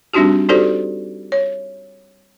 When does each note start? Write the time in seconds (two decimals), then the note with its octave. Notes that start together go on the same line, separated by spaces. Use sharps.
0.14 G3 C4 D4 D#4 F#4 G4
0.49 D#4 F#4 G4 A4 C5 D5
1.32 C#5